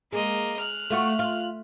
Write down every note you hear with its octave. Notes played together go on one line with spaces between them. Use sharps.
G#3 A#3 D#5
F6 F#6
A3 F4 F#4
F4